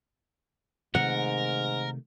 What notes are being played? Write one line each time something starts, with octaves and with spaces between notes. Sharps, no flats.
G#2 C3 D#3 A3 A#4 F#5